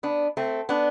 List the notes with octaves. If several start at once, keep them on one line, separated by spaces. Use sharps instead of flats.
B3 D4
A3 C4
B3 D4